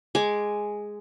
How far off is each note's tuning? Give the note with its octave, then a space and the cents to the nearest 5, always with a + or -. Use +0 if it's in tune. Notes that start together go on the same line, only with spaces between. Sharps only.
G#3 +0 G#5 +5 D6 +0